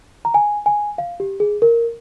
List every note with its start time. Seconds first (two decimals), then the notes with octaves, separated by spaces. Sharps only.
0.25 A#5
0.34 G#5
0.66 G#5
0.98 F5
1.20 G4
1.40 G#4
1.62 A#4